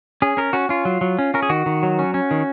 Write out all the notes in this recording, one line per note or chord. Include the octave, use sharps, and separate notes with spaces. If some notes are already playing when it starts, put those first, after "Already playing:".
C#4 G#4
C#4 A#4
C#4 F#4
C#4 F4
F#3
F#3
C#4
C#4 A#4
G#4
D#3 F#4
D#3
F#3
C#4
C#4
D#3